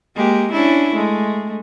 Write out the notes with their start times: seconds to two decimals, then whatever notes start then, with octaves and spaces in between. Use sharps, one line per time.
0.16 G#3 A#3 G4
0.52 C#4 D4 E4
0.94 G#3 A3